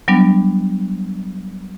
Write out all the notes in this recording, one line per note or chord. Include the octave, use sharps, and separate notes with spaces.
F#3 G3 B3 D4